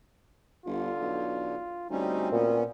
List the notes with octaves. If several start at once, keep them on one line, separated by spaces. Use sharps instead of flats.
G1 D3 F4
B1
D2 G3 C4 C#4 D#4
A#2 B3 C#4